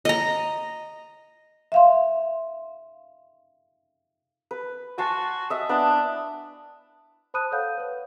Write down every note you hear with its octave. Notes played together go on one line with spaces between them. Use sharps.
D#5 A#5
E5 F5 C6
B4
F#4 G#5 A5 C6
D#5 E5
B3 D4 E4 B4
C5 A5 B5 D#6 F#6 D#7
A4 C#5 F5 F#5 G6
B4 C#5